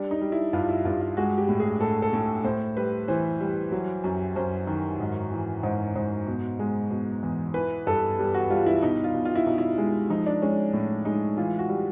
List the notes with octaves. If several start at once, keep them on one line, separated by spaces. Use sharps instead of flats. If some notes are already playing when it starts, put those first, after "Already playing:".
Already playing: G3 D4
D#4
G3
E4
G2 F4
E4
G2 F4
F4
G#3 F#4
G4
A2
G#4
A2 A4
A4
A2
A2 C5
G3 B4
E3 C5
G3
F#3
F#2
F#2 C5
D#3
G#2
E3
G#2 C5
G#2 C5
B2
G#3
B2
E2
E3 B4
G2 A4
G3
F#4
G3 F4
E4
B2 D#4
F4
B2
F4
E4
B2 D#4
E4
G#3
F3 D#4
D4
G#3 C#4
A2
G#3 D#4
E3 F4
F#4
G3